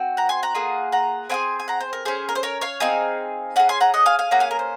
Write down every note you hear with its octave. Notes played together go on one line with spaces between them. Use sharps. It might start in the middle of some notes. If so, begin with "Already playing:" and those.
Already playing: C4 F#4
F#5 A#5
G#5 C6
F#5 A#5
A#3 F4 G#4
F#5 A#5
C4 F4 G#4 G#5 C6
G#5
F#5 A#5
C5
A#4
C#4 G#4 C5
A#4
C5
A#4 C#5
C#5 F5
C4 D#4 G#4 F5 G#5
C#4 G#4 F#5 A#5
G#5 C6
F#5 A#5
D#5 F#5
F5 G#5
F5 G#5
A#3 C#4 G#4 F#5 A#5
F5 G#5
A#4
C5